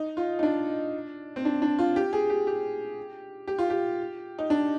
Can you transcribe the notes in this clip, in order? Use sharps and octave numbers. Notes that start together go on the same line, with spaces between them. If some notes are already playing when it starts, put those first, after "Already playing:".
Already playing: D#4
F4
D#4
D4
C4
D4
D4
F4
G4
G#4
G4
G4
G4
F4
G4
D#4
D4